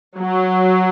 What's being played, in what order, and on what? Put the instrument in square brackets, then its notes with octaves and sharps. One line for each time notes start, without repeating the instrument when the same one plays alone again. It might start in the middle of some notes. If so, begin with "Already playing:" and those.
[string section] F#3